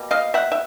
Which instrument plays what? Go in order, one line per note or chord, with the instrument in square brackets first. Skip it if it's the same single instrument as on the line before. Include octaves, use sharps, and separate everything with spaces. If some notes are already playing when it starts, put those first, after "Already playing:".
Already playing: [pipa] B2 G3 A#3
D#5 F5
E5 F#5
E5